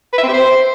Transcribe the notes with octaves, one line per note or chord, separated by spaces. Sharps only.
B4
E5
C4
G4
C5